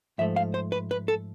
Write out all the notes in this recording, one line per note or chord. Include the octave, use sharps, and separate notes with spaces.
G#2 F3 A3 E5
F5
C5
B4
B4
A4